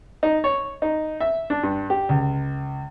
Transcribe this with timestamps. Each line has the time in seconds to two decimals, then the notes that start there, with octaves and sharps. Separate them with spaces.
0.23 D#4
0.44 C#5
0.82 D#4
1.20 E5
1.50 D4
1.63 G2
1.90 G4
2.09 C#2